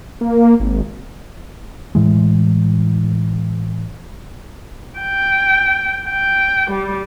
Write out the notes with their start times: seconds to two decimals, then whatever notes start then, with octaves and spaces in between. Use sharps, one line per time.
0.21 A#3
0.60 G#1
1.95 A2 E3 G#3
4.99 G5
6.08 G5
6.71 G3